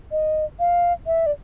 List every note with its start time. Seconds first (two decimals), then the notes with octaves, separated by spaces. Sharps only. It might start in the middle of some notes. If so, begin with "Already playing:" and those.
0.12 D#5
0.60 F5
1.07 E5
1.26 D5